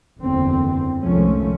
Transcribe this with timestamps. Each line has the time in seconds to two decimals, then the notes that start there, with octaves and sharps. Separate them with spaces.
0.20 F#1 E2 D3 E3 C4
1.03 C2 D#3 F3 G#3 A3 C#4